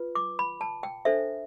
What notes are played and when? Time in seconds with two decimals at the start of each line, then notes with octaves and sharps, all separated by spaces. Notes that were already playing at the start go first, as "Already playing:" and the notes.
Already playing: F4 B4
0.15 D6
0.39 B5
0.61 A5
0.83 G5
1.05 D4 A4 C5 E5